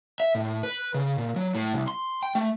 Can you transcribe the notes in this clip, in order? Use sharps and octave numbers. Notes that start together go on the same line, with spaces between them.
E5
A2
B4
C#3
A#2
F#3
A2
C2
C6
G5
A3